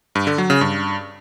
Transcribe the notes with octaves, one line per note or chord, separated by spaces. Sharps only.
G2
D3
F#3
C#3
G2